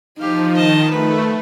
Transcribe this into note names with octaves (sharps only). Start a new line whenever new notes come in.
F3 D#4 G4 F5
D#3 D#5 A5
A3 B4